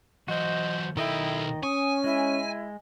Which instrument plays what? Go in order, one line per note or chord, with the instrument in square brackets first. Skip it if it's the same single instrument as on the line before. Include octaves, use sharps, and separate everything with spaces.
[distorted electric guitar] E3 F#3 [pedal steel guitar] F#4 C5 [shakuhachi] D#5
[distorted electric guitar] B1 A4 [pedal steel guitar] D#3 D#5 G5 [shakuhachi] E4
[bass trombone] C#4 [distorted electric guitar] G#5 [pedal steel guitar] C#6 [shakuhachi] D#6
[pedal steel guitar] G#3 [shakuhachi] E4